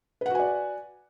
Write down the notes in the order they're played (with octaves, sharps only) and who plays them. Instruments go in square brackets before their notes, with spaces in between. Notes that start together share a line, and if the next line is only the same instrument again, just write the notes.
[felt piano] B4
F#5
F#4
G#5
D5